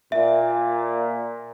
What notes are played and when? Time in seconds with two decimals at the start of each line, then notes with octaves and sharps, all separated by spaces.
0.12 A#2 E5